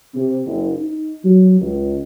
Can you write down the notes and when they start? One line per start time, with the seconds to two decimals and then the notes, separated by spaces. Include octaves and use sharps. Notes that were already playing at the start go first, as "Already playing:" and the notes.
0.15 C3
0.47 F#1
0.76 D#4
1.25 F#3
1.61 C#2